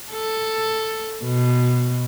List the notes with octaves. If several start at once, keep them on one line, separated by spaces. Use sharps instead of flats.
A4
B2